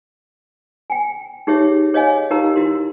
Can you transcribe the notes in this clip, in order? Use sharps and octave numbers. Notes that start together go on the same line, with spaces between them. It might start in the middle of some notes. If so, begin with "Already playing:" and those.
G5 G#5
D#4 G4 G#4 C#5 E5
G#4 C#5 D#5 F5 G#5
D#4 G4 A#4 F5 A#5
E4 F#4 A#4 C6